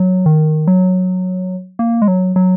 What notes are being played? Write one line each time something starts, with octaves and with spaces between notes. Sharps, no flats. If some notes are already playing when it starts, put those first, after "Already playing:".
Already playing: F#3
D#3
F#3
A#3
G#3
F#3
F#3